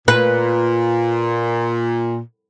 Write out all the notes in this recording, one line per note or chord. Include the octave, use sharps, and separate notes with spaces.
A#2 B4